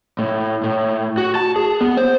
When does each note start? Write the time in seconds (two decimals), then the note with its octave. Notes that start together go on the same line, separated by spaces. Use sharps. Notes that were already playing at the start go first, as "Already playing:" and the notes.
0.19 A2
0.64 A2
1.17 F#4
1.35 A5
1.56 G#4
1.81 B3
1.97 C5